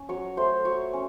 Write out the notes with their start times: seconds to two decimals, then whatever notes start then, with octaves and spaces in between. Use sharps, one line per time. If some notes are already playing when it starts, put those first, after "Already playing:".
Already playing: C#4
0.09 F#3 C#5 C#6
0.37 A3 C5 C6
0.65 F#3 C#5 C#6
0.93 C#4